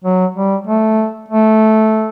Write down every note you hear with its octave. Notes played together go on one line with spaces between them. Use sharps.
F#3
G3
A3
A3